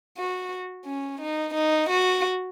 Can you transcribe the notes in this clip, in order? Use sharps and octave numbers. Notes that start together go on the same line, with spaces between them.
F#4
C#4
D#4
D#4
F#4